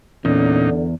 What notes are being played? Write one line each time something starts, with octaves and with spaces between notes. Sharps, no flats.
E2 A#2 D3 C#4 D#4